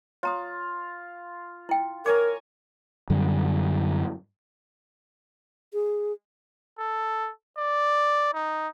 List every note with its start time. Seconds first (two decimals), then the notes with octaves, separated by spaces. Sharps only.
0.23 F4 C#5 A#5 D#6
1.69 E4 G5
2.06 A#4 C#5 G#5 A#5 D6
3.10 F#2 D3 G3
5.73 G#4
6.79 A4
7.58 D5
8.34 D#4